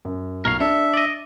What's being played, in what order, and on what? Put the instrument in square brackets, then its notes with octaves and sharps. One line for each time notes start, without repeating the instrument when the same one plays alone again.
[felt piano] F#2
[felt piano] B1 [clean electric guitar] A#4 C#5 F5
[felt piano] D4 [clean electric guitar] A4 [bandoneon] E5
[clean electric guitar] D5 D#5